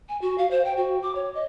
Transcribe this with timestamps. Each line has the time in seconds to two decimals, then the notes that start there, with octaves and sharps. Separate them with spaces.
0.09 G#5
0.21 F#4
0.38 F5
0.51 C5
0.65 G5
0.77 F#4
1.02 D6
1.15 C#5
1.35 D#5